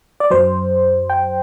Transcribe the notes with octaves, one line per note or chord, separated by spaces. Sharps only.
D5
F#2 F#3 C5
G5